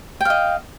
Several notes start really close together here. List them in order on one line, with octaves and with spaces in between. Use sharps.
G5 F5 D#5